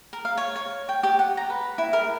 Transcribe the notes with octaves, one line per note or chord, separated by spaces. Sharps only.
A#4
F5
C#5
C#5
G5
G4
F#5
A#5
B4
E4
A#4